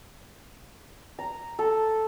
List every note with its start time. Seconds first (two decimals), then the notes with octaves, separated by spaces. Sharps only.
1.19 A#5
1.59 A4